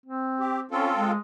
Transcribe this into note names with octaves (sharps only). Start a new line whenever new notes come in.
C4
G4
C4 C#4 F4 A4
G#3